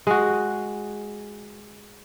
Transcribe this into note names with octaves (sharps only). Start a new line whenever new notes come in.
G#3 F#4